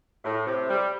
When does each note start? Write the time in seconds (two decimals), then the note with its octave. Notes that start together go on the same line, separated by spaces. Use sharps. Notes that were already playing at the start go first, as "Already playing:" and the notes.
0.24 A2
0.46 C3
0.68 G3